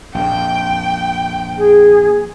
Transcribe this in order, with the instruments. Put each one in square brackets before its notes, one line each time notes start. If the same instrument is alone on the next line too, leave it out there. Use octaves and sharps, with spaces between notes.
[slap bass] A#1 F2 A#2 [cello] G5
[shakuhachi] G#4